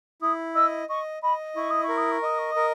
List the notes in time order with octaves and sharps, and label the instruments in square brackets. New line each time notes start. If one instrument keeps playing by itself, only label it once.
[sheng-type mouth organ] E4 [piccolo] D#6
[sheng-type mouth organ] D#5 [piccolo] E6
[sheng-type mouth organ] D#5 [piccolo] C#6
[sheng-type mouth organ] D#5 [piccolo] B5
[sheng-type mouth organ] E4 [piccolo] C#6
[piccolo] D#6
C#6
[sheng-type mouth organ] A#4
[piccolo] D#6
C#6
[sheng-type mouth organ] D#5 [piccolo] D#6
[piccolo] C#6
[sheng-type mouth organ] A#4 [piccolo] D#6